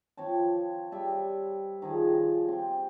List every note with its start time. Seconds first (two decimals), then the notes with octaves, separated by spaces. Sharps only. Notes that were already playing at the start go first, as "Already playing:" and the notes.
0.17 F3 C4 C#5 A5
0.92 G3 E5 A5
1.82 D#3 F3 G#4
2.08 F4
2.48 C4 G4